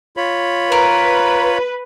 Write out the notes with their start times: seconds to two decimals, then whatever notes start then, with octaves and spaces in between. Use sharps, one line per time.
0.17 F4 C#5 B5
0.72 A#4 B4